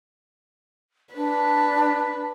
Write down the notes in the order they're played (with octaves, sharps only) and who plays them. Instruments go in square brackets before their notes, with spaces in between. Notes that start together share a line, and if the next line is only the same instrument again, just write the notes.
[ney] D4 [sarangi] B4